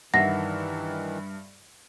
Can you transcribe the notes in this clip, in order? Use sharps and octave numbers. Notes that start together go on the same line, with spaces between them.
G2 D#3 E3 E5 F#5 A#6